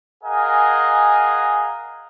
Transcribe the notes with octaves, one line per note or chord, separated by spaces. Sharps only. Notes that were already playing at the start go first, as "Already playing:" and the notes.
G#4 A#4 D#5 F5 F#5 G#5